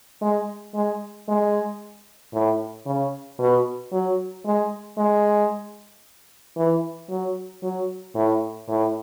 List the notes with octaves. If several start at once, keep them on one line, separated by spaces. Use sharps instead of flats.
G#3
G#3
G#3
A2
C#3
B2
F#3
G#3
G#3
E3
F#3
F#3
A2
A2